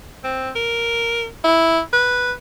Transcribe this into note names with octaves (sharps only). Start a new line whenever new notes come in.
C4
A#4
E4
B4